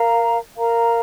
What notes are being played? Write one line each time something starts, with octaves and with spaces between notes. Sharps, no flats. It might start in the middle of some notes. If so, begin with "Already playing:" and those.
Already playing: A#4 F5 A#5
A#4 F5 A#5